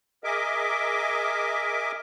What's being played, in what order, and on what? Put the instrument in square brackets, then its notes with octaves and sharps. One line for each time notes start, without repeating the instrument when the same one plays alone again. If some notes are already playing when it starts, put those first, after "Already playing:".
[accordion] G#4 A#4 D#5 E5 D6